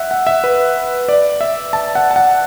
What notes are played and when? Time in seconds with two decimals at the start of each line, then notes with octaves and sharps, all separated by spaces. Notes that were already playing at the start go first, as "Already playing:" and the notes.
Already playing: E5 F#5
0.11 F#5
0.27 E5
0.44 B4
1.09 D5
1.41 E5
1.73 A5
1.95 F#5
2.11 A5
2.16 F#5